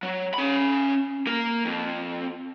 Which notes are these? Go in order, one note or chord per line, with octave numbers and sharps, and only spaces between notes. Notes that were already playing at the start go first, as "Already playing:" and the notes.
F#3
C#4 B5
A#3 A#4
F2